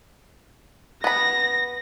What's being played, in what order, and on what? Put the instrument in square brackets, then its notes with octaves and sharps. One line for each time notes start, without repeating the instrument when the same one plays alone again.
[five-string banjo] B3 B5 [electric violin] A#6